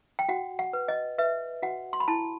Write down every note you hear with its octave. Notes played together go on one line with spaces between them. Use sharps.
G5
F#4 F#5
F#5
B4
D#5
B4 E5
F#4 F#5
C6
B5
E4 A5